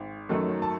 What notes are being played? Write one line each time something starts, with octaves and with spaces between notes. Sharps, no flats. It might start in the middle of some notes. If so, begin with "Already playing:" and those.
Already playing: G#1
F#2 D#3 F#3 A3
A5